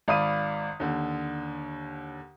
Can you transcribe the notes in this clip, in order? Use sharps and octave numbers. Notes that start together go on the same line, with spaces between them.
G#1 D5 F5 B5 D#6 D#7
D#2 D3